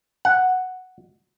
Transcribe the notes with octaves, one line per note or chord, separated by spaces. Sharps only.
F#5